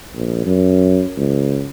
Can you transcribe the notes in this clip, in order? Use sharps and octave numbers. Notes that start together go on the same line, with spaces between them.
A#1
F#2
C#2